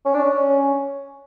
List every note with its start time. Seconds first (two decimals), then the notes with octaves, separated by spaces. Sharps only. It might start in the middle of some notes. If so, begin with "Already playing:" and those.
0.05 C#4
0.14 D4
0.23 C#4